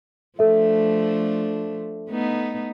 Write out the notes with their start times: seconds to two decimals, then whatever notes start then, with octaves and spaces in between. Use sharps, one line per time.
0.39 F3 A3 D4 A4 E5
2.09 A3 B3 D#4